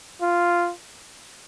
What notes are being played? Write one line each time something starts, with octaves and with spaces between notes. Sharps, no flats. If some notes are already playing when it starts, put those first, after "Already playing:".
F4